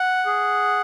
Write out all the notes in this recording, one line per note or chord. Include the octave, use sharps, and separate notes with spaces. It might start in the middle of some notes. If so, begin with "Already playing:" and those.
Already playing: F#5
G#4